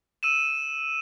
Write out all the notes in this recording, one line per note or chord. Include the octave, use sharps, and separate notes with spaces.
E6 D#7 E7